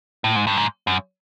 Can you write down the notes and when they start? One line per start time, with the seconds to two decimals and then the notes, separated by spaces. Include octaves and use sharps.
0.24 A2
0.36 G#2
0.47 G2
0.57 G#2
0.87 F#2